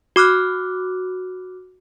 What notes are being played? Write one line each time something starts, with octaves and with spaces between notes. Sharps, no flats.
F#4 D6 F6 F#6